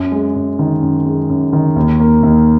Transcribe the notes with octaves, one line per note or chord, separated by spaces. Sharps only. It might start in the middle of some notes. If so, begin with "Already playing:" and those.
Already playing: F#2
G#3
F#2
D#3
F#2
G#3
F#2
D#3
D#2
A#3
D#2